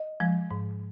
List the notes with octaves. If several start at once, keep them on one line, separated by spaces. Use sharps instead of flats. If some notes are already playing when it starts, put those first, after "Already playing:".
Already playing: D#5
F3 G#3
G#2